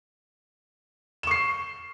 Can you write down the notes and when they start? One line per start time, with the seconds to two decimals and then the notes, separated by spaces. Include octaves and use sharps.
1.23 E7
1.27 C#6
1.31 C7